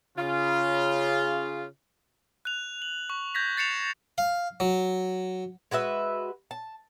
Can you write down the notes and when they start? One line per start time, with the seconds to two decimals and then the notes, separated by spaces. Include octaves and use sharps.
0.17 C#3 F4
2.45 F#6 F7
2.82 F#7
3.10 C#6
3.35 G6 G#6 A#6 B6
3.57 A6 C7 C#7 E7 F7
4.18 F5
4.60 F#3
5.71 G#3 F#4 B4 E5
6.51 A5